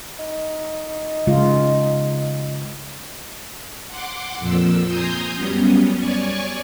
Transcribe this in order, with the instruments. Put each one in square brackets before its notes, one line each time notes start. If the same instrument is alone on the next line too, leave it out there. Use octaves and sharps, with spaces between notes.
[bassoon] D#4
[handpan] C#3 G#3 F4
[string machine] F#5 C6 D6
F2 A#2 F3 E6
G#5 A#5 C6 D#6 G6
F#2 G3 B3 C#4
C#5 D5 G#5 C#6